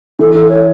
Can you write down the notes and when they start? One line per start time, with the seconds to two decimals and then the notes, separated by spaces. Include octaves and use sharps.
0.19 E3 A4
0.34 A4
0.49 C#5